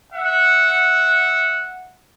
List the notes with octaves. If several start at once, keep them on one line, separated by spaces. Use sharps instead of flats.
E5 F#5